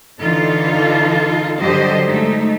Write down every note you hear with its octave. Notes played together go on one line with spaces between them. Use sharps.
D3 E3 D#4 F4 A4
G2 D3 F#3 G4 C5 D#5
G#3 A3 D#4